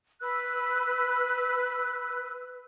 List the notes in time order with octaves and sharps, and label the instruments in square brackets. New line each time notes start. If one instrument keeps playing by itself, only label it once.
[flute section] B4 E6 F#6